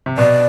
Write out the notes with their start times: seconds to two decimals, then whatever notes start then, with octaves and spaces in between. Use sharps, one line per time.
0.06 C3
0.18 B2 D5